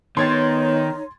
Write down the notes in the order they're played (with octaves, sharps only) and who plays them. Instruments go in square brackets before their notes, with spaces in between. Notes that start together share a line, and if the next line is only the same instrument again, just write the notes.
[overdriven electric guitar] D#3 [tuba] B3 [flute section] D#4 C#5 [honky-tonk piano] C6 G#6 A6